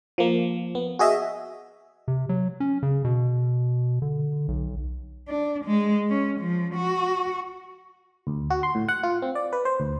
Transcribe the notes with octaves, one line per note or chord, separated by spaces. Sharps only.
F3 A#3
B3
F#4 G#4 D#5 E5
C3
F#3
C#4
C#3
B2
D3
B1
D4
G#3
C#4
F3
F#4
D2
F#4
C6
A2
F#5
F4
C4
D5
B4
C5
D2